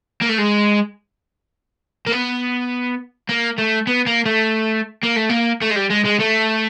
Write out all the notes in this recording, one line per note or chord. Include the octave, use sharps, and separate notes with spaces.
A#3
A3
G#3
A#3
B3
A#3
A3
B3
A#3
A3
A#3
A3
A#3
A3
G#3
G3
G#3
G#3
A3